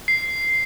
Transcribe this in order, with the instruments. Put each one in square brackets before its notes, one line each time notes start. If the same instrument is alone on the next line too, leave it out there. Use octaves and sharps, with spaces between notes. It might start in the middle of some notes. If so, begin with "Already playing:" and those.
[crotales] C7